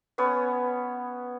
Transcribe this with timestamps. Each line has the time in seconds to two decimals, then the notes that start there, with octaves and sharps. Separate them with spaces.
0.18 B3 C#4 C#5